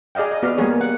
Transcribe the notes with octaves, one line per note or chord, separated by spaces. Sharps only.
G#4 D5 D#5 F5 G5
D#5
B3 F#4 D5 F5
G3 A#3 B3 G#4 C#5
F#5